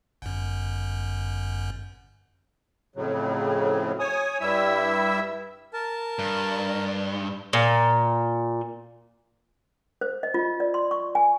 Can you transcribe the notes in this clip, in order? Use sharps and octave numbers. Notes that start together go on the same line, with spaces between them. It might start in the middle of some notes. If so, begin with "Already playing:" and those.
G1 F#2
F2 A2 C#3 F#3
C#5 G#5 D#6
G2 G3 E4 E5 E6
A#4 A5
G2
A#2
C5
D#5
F4
D5
C6
C#6
G#5